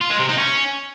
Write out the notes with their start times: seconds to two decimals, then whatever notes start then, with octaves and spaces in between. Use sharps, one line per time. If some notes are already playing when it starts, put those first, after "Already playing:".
0.01 F4
0.10 G#3
0.20 C3
0.29 D#4
0.38 C#4